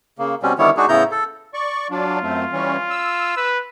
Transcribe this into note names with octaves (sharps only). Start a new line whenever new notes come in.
C#3 A#3
B2 G3 C4 C#4
D3 D#3 G3 B3 E4 C#5
G#3 D4 D#4 F#4 G#4
A2 C#3 B3 E4 A#5 G6
A4
D5 C#6
F#3 D4 F4
F#2 A3 C4
E3 G3 C#4
E6
B4